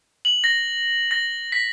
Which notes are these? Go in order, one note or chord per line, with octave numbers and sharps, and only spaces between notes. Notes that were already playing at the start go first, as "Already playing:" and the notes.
F#7
A#6
A#6
B6